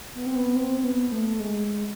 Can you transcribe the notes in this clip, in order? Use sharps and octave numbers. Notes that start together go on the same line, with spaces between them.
B3
C4
B3
C4
C4
B3
A3
G#3